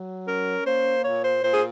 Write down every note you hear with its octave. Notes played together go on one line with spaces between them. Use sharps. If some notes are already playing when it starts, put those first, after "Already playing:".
Already playing: F#3
C#4 A#4
A#3 C5
A#2 C#5
C5
A#2 C5
G#4